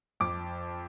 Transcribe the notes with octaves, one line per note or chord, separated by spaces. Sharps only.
F2 D6